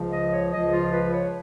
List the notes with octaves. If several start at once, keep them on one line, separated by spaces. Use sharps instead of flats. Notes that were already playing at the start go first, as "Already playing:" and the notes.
Already playing: C#2 C#3 F3
D#5
C#5
C#2 C#3 F3 D#5
F4
B4
C#5